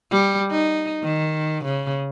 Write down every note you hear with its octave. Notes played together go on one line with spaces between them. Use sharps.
G3
D#4
D#3
C#3